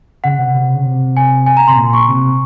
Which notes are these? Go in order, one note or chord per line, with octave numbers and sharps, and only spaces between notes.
C#3 F#5
C3
C3
C#3
C3
G#5
G#5
A#5
C3 C6
A#2
C#6
C3